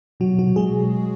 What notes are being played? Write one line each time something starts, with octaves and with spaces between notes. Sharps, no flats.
B2 F#3 F#4
F#3 F#4
B2
G#3 G#4